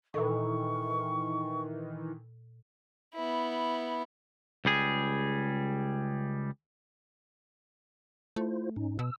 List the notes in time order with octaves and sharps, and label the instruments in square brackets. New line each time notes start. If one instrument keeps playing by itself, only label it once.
[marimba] A#2 A4 [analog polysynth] D#3 E3 [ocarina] C#6
[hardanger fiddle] B3 E4
[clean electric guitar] C#2 G3 G#4
[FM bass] A3 [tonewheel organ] E4 F4 C5
[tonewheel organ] G#2 C#4 D#4
[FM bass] B2 [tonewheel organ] E6